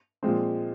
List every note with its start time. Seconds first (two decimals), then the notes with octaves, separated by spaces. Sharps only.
0.23 A#2 F3 G#3 C4